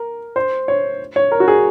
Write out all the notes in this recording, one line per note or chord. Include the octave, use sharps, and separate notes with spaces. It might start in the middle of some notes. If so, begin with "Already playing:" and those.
Already playing: A#4
C5
C#5
C#5
A#4
F#4
G#4